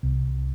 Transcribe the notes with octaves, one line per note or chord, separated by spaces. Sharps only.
C2